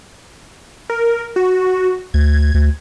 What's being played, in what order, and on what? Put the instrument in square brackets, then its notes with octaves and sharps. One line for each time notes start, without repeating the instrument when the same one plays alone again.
[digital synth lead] A#4
F#4
[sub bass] D2 [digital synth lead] G#6
[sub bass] D2